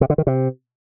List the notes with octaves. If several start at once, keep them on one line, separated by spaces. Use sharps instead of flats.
C3
D3
D#3
C3